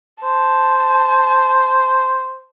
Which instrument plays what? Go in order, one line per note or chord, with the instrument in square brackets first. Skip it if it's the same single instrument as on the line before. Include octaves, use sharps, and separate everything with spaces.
[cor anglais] C5 [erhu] A5